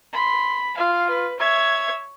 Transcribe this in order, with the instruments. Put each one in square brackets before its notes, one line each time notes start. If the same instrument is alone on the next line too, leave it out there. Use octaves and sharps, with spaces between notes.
[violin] B5 [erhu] C6
[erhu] F4 [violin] F5
[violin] B4
[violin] C#5 G#6 [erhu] E5